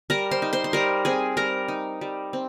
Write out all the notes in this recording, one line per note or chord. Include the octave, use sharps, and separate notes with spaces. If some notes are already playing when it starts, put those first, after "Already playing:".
G3 A#4 A#5
C5 C6
D#4
C5 C6
C6
G3 A#4 A#5
C4 G#4 G#5
G3 A#4 A#5
D#4
G3
C4